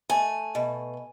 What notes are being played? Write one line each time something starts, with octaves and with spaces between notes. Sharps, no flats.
A3 G#5
B2